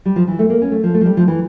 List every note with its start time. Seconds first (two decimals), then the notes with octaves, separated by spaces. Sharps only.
0.05 G3
0.16 F3
0.28 E3
0.39 A3
0.50 A#3
0.62 C#4
0.72 A3
0.83 F3
0.94 A3
1.01 F3
1.06 G3
1.17 F3
1.28 E3